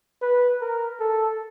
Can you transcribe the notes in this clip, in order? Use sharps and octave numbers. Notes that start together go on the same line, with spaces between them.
B4
A#4
A4